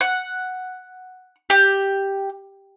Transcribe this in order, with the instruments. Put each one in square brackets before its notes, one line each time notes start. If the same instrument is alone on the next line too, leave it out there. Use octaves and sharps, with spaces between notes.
[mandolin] F#5
G4